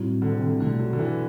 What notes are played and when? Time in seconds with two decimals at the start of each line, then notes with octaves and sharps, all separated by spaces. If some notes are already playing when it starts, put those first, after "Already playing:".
Already playing: A2 F#3 G3 C4 E4
0.22 D3
0.32 C3
0.42 D3
0.60 B2 D3 A3 D4
0.79 F#3
0.93 D3
0.99 E3